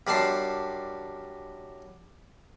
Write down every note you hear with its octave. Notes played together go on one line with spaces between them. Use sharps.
F#2 G3 D4 A5 C6